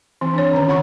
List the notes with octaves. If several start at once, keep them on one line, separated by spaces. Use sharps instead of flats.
E3 C4
D4 C#5
D3 D#3 C#4 A#5
D3 F4 C#5 F#5 B5 C#6